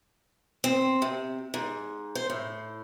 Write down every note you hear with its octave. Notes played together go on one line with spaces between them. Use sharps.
C4
C3
G#2
C5
A2